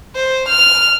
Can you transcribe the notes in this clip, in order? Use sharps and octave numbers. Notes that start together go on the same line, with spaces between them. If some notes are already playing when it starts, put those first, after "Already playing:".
C5
F6